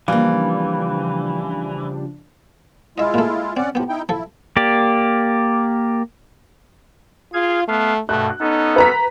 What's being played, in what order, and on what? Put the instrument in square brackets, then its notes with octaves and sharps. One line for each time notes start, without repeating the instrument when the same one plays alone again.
[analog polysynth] C#3 F3 D4 [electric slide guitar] E3 [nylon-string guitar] G3 A#3 [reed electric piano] F5
[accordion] G#3 E4 F4 [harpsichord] D#5 E5
[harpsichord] A#2 A3
[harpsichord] C4 [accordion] C#4 D5 F#5
[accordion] A2 F3 [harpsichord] B3 G4
[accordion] D#4 E4 G5
[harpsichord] F3 A4 [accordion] E4
[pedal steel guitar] A#3 G4 D5
[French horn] F4 [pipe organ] G#4 F5 G#6
[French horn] A3 [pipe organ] B3 F5
[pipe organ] G2 B2 [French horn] A3 [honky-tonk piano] F#6
[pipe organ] B3 C#4 A4 [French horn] D#4
[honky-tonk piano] B4 A#5 B6